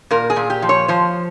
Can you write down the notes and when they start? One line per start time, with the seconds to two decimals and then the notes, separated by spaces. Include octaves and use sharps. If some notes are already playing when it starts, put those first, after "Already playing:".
0.11 A#2 A#4
0.30 G#4
0.36 A#2
0.50 G4
0.62 F3
0.69 C#5
0.88 F3 C5